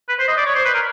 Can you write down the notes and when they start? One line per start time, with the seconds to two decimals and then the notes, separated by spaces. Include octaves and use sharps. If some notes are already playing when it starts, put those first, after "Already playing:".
0.08 B4
0.19 C5
0.28 D#5
0.37 D5
0.46 C#5
0.55 C5
0.65 B4
0.74 A#4